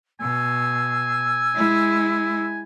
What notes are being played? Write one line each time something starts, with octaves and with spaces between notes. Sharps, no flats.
B2 G#5 E6
G#3 E4